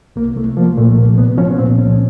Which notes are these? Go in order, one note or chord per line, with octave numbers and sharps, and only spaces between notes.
C2 A#3
C2 A3
F3 A#3
A#2 A3
C2 A#3
C2 B3
F3 C#4
B3
A#2 C4
C#2 C#4